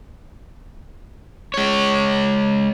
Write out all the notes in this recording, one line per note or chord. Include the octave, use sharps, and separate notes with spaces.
G#3 C#5